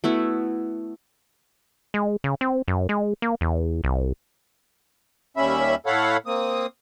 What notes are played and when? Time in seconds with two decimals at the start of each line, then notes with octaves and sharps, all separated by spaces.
0.04 A3 B3 E4 F#4
1.94 G#3
2.24 C#3
2.41 C4
2.68 F#2
2.89 G#3
3.22 A#3
3.41 E2
3.84 C2
5.37 D#2 G3 C#4 E5 B5
5.86 A2 A4 C#5 F5 F#5 B5
6.26 A#3 C4 D#6